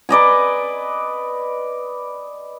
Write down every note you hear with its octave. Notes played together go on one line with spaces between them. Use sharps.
B4 D5 D#5 G#5